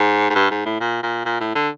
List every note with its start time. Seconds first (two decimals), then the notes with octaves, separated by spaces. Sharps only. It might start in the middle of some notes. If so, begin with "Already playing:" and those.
Already playing: G#2
0.30 G#2
0.35 G2
0.51 G#2
0.65 A2
0.81 A#2
1.03 A#2
1.25 A#2
1.40 A2
1.55 D3